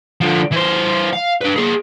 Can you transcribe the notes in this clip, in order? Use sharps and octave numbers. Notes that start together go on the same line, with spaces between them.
D3 F3
E3 C5
F5
D4 B4
A#3 G#4